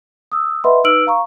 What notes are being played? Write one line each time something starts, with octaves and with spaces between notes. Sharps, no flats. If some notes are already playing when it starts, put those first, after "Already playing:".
D#6 E6
B4 D#5 E5 F#5 B5 C6
D#4 B4 E6 F6 D7 F#7
F5 A#5 C#6